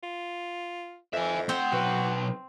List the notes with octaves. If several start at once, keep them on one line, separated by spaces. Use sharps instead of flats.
F4
F2 E5 G#5
A3 C4 C5 F#5
B1 F#4 B4